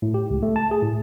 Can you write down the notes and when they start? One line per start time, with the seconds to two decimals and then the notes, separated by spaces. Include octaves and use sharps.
0.02 A2
0.14 G4
0.30 C#2
0.43 A3
0.56 A5
0.71 G#4
0.83 A2